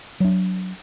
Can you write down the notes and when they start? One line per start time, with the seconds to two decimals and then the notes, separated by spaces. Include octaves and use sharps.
0.20 F#3 D4